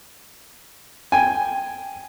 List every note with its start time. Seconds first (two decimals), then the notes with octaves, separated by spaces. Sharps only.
1.12 G5 G#5